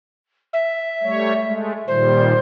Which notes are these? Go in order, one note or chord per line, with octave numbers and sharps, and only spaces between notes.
E5
G3 A3 C#5
G#3 A3
A#2 D#3 G3 C5